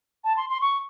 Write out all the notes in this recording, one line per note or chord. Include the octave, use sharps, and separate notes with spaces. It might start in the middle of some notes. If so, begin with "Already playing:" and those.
A5
C6
C6
C#6